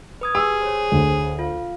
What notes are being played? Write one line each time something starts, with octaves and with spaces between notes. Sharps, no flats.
B4 D#6 G#6
G4 G#4 E6
C5 C#5
D2
F4 F5